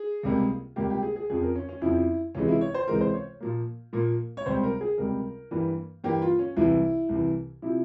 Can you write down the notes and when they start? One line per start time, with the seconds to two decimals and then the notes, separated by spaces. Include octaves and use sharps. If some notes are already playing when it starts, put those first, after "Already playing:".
Already playing: G#4
0.23 C#2 C3 G3 A#3
0.76 C#2 C3 G3 A#3 G4
0.90 G4
1.02 G#4
1.16 G#4
1.30 F2 C#3 F3 G#4
1.43 A#4
1.55 C#4
1.69 C#4
1.81 F2 C#3 F3 E4
2.35 C#2 C3 E3 G#3 C#4
2.48 E4
2.61 C#5
2.74 C5
2.88 C#2 C3 E3 G#3 A#4
3.01 C5
3.14 C#5
3.40 A#2 F3 A#3
3.93 A#2 F3 A#3
4.37 C#5
4.46 C#2 C3 G3 C5
4.63 A#4
4.81 G#4
4.98 C#2 C3 G3 A#4
5.51 G2 E3 G3 A#3
6.04 G2 E3 G3 A#3 G4
6.22 F4
6.39 C#4
6.56 C2 C3 E3 E4
7.09 C2 C3 E3
7.62 C3 F3 E4